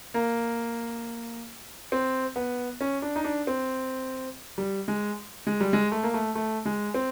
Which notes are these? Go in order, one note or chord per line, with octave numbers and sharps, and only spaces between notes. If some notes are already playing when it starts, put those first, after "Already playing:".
A#3
C4
B3
C#4
D4
D#4
D4
C4
G3
G#3
G#3
G3
G#3
A3
A#3
A3
A3
G#3
C4